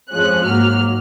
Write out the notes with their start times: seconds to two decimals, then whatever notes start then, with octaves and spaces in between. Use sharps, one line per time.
0.11 F2 F3 G#3 C#4 F#6
0.45 G#2 F#3 A#3 F6